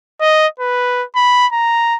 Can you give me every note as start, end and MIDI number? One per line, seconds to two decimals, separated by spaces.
0.21 0.47 75
0.59 1.04 71
1.16 1.47 83
1.53 1.97 82